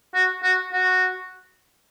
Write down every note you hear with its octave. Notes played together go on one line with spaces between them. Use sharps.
F#4
F#4
F#4